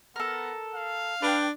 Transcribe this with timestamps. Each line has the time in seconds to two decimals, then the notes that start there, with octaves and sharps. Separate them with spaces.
0.16 B3 A4 A#4
0.74 F5
1.22 D4 B4 G5